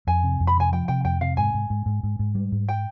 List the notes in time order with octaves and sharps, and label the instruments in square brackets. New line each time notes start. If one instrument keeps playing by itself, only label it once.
[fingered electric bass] F2 [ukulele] G#5
[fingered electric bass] C3
F2
[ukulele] B5
[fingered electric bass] C3 [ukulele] G#5
[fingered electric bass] F3 [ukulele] G5
[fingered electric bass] C3 [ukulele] G5
[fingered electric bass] F2 [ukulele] G5
[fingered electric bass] C3 [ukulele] F5
[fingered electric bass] G#2 [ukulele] G#5
[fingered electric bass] G#2
G#2
G#2
G#2
G#2
G3
G#2
[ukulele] G5